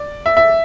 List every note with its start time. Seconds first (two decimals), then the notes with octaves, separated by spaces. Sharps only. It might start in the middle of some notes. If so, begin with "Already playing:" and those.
Already playing: D5
0.26 E5
0.37 E5